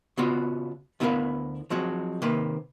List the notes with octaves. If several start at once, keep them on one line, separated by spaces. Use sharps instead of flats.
C#3 B3 F4 F#4
D2 B3 E4 A#4 B4 F5
F3 F#3 G#3 C4 F#4
C3 D#3 A#3 B4